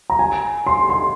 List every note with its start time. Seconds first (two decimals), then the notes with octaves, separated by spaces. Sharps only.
0.10 A#5
0.19 G#5
0.67 C6
0.89 C6